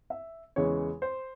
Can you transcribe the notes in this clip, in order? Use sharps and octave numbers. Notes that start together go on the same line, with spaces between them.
E5
E2 C#3 E3 G#3 C#5
C5